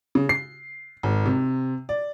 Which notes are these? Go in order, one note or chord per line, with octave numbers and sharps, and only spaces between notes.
C#3
C7
G#1
C3
D5